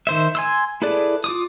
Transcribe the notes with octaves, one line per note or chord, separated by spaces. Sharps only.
D#3 C5 E5
G#5 C6 E6
E4 G#4 A4 B4 D5
F4 D6 D#6